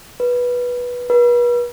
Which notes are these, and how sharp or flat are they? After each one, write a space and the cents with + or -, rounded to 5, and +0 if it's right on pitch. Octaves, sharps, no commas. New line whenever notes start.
B4 -10
B4 -40